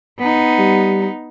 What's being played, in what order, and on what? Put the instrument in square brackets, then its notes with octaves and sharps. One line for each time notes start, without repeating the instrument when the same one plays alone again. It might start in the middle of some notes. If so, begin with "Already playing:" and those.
[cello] B3 D#4
[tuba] G3